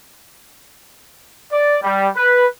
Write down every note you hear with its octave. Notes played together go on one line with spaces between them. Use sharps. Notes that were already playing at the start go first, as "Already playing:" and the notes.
D5
G3
B4